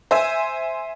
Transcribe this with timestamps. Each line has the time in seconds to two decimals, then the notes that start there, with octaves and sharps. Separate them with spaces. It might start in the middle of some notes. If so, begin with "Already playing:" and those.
0.11 C5 E5 G#5